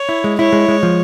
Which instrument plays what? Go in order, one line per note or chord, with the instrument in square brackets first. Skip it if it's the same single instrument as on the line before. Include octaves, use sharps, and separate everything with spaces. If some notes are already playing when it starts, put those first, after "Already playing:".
Already playing: [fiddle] C#5
[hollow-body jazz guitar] E4
G#3
[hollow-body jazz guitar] E4 [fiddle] C#5
[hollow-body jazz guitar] G#3
G#3
F3